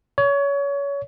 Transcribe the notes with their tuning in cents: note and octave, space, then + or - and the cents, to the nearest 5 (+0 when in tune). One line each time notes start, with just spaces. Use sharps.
C#5 +25